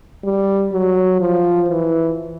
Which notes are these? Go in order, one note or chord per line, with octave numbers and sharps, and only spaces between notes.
G3
F#3
F3
E3